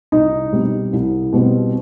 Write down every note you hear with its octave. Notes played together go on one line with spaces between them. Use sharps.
C2 D#4
B2 G3 C4
C2
B2 G3 C4